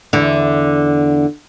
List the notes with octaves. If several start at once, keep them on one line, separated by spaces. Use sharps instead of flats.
E2 D3